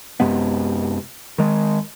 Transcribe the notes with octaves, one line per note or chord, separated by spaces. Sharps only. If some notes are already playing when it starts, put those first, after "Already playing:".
F#2 C3 G#3 B3
D#3 G#3